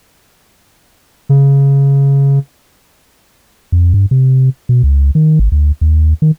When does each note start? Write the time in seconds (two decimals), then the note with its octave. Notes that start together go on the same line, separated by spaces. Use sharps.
1.29 C#3
3.72 F2
3.94 G2
4.11 C3
4.69 B2
4.83 C#2
5.15 D#3
5.39 G#1
5.52 D2
5.81 D#2
6.22 D#3